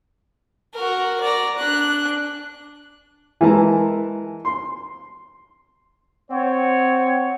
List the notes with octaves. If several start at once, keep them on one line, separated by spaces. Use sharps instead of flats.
F#4 A#4
D5 A#5
D4 F#6
E3 G#3 A#4 A5 A#5
C6
C4 C#5 F#5